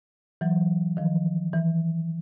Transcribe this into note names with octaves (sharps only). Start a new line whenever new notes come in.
E3 F#3
D#3 F3
E3